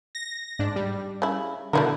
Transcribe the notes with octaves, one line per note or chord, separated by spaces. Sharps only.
A#6
G#2 D4
G3
C#3 E4
B2 D3 A3 E4 A#4